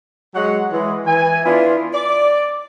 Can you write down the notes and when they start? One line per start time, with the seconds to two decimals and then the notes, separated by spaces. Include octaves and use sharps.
0.34 F#3 G#3 C#5 F#5
0.72 E3 G#3
1.06 E3 G#5
1.45 B3 D4 E4 F4
1.94 D5